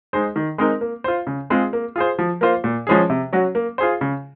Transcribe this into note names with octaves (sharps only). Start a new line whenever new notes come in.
G#3 D#4 G#4 C5
D#3
G#3 C4 D#4 A#4
A#3
F4 C5
C#3
G#3 C4 F4 G#4
A#3
F4 G#4 C5
F3
A#3 F4 C5
A#2
F3 G#3 C#4 G#4
C3
F#3 C#4 F#4
A#3
F4 G#4 C5
C#3